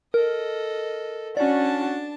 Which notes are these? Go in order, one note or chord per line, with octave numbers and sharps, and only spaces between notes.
A4 A#4 D#5
C#4 D4 F#4 D5 A5